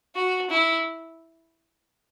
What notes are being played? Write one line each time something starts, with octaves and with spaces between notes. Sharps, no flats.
F#4
E4